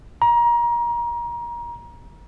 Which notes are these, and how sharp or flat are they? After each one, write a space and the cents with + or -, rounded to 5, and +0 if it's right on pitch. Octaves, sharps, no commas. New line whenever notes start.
A#5 +25